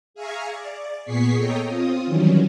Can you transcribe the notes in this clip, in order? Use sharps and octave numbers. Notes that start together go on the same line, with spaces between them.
G#4 E5 F5 G#5 A#5 C#6
D5
A#2 B3 G#4 C#6 B6 C7
A4 C#5 D#5 G5 A#5
C4 F4 D#6
D#3 E3 F#3 G3 C#4